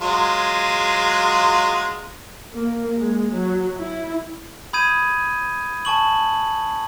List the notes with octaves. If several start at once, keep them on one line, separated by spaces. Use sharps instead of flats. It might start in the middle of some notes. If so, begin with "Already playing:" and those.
F#3 G#3 F4
A#3
G#3
F#3
E4
B5 D#6 G6 G#6 D#7
G#5 A5 C#6 F#7